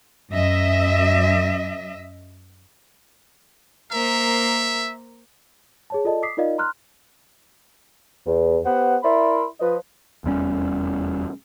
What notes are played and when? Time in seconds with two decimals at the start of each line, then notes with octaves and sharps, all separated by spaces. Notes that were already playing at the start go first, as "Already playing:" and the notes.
0.32 F#2 D#5 E5
3.92 A#3 A#4 C5 E5
5.90 G#4 C#5 A5
6.05 F4 A4 D5 D#5 A5
6.22 D6 D#6 B6 C7
6.37 D#4 F4 A#4 D5 D#5 F5
6.58 A#5 C6 F6 F#6
8.26 E2
8.66 B3 G4 B4 C5 F#5
9.03 E4 A#4 D5 E5 B5 C6
9.60 F3 B4 D#5
10.24 F1 E2 G3 C#4